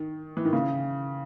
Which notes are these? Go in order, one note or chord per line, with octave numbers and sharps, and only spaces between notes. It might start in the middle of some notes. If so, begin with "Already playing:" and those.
Already playing: D#3
E3
D#3
C#3